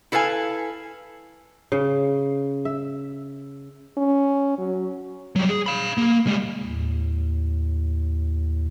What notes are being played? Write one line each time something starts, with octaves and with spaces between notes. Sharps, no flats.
E4 A4 B4 F5 G#5
C#3
E5
C#4
F#3
F#3 G3
G#4
F5 B5
A#3
G3 G#3
D#2 A2